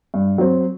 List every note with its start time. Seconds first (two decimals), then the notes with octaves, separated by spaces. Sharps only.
0.14 G2
0.38 F#3 C4